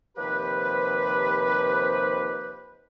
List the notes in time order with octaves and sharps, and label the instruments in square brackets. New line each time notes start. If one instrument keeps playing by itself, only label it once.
[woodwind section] D#2 C3 F3 G4 B4